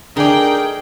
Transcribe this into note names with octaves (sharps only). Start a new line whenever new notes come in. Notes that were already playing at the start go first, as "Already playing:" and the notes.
D3 D4 D#4 G#4 A#4 D5 G5